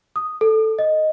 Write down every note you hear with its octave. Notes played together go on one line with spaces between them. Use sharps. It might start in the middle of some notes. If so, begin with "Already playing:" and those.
D#6
A4
D#5